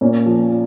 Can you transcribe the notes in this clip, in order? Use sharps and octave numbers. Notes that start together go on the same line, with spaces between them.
A#2 A#3 C#4
F3